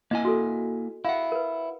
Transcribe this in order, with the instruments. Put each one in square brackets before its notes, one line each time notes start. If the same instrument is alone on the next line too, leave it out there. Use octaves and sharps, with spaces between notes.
[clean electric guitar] A#3 E4 G#5 [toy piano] D#5
[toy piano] F#4 A4
[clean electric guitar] E4 F#5 [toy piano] F5
[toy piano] A#4 B4